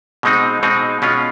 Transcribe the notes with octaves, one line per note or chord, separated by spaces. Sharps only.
B2 G#3 C4 D#4
B2 G#3 C4 D#4
B2 G#3 C#4 F4